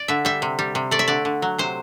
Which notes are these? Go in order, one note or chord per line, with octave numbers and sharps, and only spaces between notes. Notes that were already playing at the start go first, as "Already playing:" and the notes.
Already playing: D5
D3 E5
G3 E5
C3
G3
C3
A3 D5
E5
D3 D5
D3
F#3
C3 C5